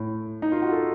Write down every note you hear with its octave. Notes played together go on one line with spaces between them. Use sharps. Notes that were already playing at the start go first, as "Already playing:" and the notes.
Already playing: A2
D#4
F4
F#4
A4